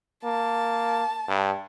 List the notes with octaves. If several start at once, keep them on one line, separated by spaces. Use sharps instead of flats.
A#3 A5
G2